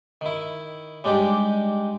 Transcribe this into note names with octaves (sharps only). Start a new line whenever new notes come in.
D#3 E4
G3 G#3 D4 D#4 G4